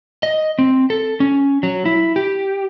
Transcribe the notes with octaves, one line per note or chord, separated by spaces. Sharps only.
D#5
C4
A4
C#4
F#3
E4
G4